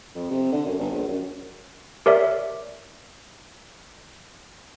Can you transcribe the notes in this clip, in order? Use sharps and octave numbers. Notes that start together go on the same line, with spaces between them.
F2
C3
D3
F#2
G1
A#1
F#2
G4 A#4 C#5 D5 E5